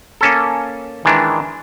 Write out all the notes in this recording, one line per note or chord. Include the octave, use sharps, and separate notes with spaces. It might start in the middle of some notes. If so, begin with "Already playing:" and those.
A#3 C#4 A4
D#3 E3 G#3 D4